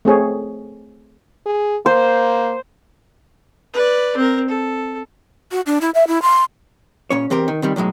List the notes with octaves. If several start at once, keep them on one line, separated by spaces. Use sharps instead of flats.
A3 C4 G#4 C#5
G#4
A#3 C5
B4 D5
C4 A#4
A4
F#4
D4
E4
E5
E4
C6
A#2 C#4 C#5
E2 C4 G4 A#4
D#3
C3 D#3 G3
B1 A2 F#3 G#3